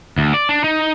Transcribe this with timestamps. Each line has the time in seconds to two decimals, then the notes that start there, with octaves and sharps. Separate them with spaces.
0.18 D2
0.34 D5
0.49 D4
0.64 D#4